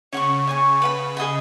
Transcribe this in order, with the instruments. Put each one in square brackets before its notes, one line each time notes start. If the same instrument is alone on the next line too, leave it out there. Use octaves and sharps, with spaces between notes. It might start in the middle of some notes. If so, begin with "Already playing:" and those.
[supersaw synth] C#3 [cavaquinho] C#5 F#5 C#6
[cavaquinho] C#5 G#5 C#6
B4 F#5 B5
G#4 D#5 F#5 B5